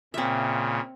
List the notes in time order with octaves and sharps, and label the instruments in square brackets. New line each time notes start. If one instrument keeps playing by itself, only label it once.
[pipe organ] A#2 C#3 [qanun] C4 E5